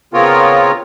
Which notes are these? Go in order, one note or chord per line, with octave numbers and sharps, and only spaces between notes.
C#3 B3 C4 F4 A#4 C#5